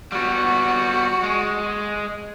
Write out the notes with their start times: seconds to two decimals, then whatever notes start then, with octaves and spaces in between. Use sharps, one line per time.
0.12 G3 B3 F#4
1.23 G#3